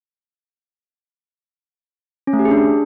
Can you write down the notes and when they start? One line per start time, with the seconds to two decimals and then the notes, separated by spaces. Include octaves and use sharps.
2.27 C#4
2.33 A3
2.39 G4
2.45 G#4
2.51 D4